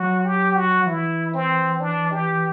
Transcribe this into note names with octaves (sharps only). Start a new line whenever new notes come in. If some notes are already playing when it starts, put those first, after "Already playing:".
Already playing: F#3 F#4
G4
F#4
F#3
E3 E4
C4
D4
G4